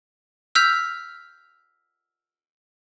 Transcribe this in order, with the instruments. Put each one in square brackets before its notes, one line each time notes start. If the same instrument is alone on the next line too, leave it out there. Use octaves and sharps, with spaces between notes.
[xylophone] E6 F6 G6 B6 F7